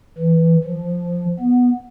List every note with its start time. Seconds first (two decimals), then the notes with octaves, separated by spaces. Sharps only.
0.18 E3
0.64 F3
1.39 B3